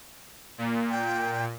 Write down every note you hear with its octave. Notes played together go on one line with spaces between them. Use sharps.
A#2
G5